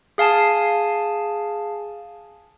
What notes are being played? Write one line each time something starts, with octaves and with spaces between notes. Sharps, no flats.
G#4 F5 G#5 A5